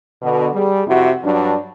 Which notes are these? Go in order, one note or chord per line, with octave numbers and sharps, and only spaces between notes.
B2 D3
G3 G#4
F2 C3 E4 F#4
G2 F#3 D4